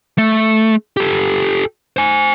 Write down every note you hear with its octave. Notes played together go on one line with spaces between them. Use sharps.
A3
G4 A4
C5 G#5